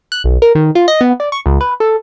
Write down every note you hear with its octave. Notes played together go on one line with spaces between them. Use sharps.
F#6
B1
A#4
D#3
F4
D#5
B3
D5
C#6
C#2
B4
A4